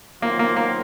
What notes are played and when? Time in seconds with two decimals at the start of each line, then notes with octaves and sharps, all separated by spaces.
0.22 D#3 F#3 A#3 C4 F4
0.39 A#3
0.56 A#3